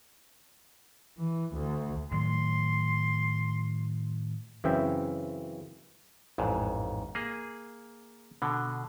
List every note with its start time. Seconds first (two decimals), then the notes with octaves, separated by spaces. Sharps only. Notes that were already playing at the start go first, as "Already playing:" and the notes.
1.18 E3
1.54 D2
2.11 A2 D#3 F#3 C6
4.64 F#2 C#3 E3 C4 E5 G5
6.38 A1 F2 G#2
7.15 A#3 G#4
8.42 B2 D3